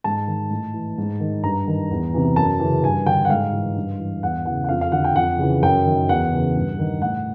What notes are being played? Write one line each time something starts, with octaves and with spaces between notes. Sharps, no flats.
G#2 A5
D#3
A2
E3
G#2
D#3
G2 A#5
D#3
E2
C3 E3
F#2 A5
C#3 E3
G2 G#5
D3 G5
F#5
G#2 F5
E3
G2
E3
E2 F#5
C#3 E3 F#5
F#5
F2 F5
F5
D3 F#5
G5
F2 F#5
C#3 E3
F#2 G5
D#3
E2 F#5
C#3 E3
G2
D#3
A2 F#5